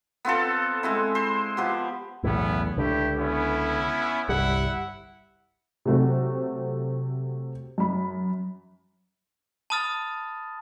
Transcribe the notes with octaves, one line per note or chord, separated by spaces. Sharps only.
B3 C4 F4 A4
G#3 C4 E4
C5
F3 B3 G4
B1 E2 A2 B3 C#4 E4
C#2 D3 A3 E4 G4
B3 C#4 E4
G1 C2 G3 E4 E5 F#5
C3 F#3 A3 C4 F#4
F#2 B5
A5 B5 D#6 F6 A6